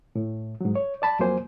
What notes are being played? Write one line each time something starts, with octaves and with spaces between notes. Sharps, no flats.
A2
G#2 F#3
C#5
D5 A5 B5
F2 F#3 A#3 C5 G#5